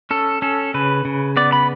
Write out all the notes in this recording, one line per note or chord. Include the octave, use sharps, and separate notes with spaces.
C#4 A4
C#4 A4
C#3 B4
C#3
B3 D5
B5